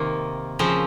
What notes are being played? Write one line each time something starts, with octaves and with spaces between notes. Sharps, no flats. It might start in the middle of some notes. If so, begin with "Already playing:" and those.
Already playing: C3 D#3 A#3
C#3 F3 C4